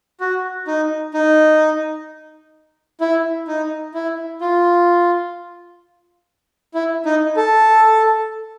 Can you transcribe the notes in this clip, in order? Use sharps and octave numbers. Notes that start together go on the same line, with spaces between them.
F#4
D#4
D#4
E4
D#4
E4
F4
E4
D#4
A4